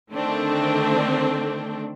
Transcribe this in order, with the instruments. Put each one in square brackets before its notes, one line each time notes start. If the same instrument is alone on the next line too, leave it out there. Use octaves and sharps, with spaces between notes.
[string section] D3 D#3 A3 C4 D4